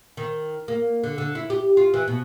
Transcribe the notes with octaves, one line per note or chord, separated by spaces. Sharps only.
D#3
A#3
D3
D3
E4
G4
F4
E3
B2